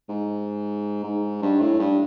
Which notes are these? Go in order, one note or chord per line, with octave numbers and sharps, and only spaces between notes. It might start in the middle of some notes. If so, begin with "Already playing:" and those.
G#2
G#2
G2
A2
G2